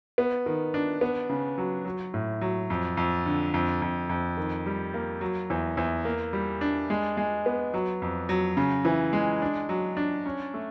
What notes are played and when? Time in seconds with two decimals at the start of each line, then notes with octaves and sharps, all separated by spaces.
0.18 B3
0.46 D#3
0.74 D4
1.01 B3
1.29 C#3
1.58 F#3
1.85 F#3
2.14 A2
2.41 F#3
2.70 F2
2.97 F2
3.26 D3
3.54 F2
3.82 F2
4.09 F2
4.37 D#3
4.66 G3
4.94 A#3
5.21 F#3
5.50 E2
5.77 E2
6.05 A#3
6.33 G3
6.61 D4
6.90 G#3
7.17 G#3
7.46 B3
7.74 F#3
8.02 F2
8.29 F#3
8.57 C#3
8.85 E3
9.13 G#3
9.42 D4
9.69 F#3
9.97 D4
10.26 C#4
10.54 A3